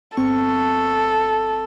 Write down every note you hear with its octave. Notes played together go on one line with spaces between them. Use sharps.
G1 C4 A4 C#6